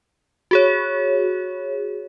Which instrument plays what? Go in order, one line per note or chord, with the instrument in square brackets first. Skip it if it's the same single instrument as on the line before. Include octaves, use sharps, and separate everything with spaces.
[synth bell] F#4 G#4 C#5